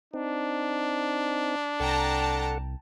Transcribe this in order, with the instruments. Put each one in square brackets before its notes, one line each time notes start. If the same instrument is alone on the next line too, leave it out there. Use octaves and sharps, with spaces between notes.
[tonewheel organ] C4 D#4 [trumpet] D4
[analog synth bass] C2 [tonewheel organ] A4 F#5 [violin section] G5 A5 A#5